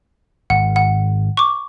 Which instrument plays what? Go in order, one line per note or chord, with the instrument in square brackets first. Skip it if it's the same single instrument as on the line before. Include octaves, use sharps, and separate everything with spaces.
[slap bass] G#1 [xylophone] F#5
[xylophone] F#5
C#6 D6